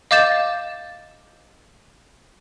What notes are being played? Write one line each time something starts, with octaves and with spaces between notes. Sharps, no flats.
D#5 F5 D6 G6 A6 E7